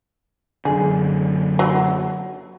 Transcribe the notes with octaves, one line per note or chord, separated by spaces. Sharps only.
F#2 D3 G#4
F#3